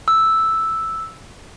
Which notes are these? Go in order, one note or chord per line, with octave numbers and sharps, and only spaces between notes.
E6